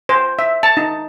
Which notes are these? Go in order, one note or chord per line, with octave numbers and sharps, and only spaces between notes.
C5
E5
A5
D#4